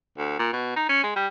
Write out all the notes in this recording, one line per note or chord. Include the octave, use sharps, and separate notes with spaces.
D2
A#2
B2
D#4
C#4
G#3
G3